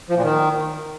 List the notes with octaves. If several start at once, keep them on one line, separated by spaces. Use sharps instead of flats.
F3
A#2
D#3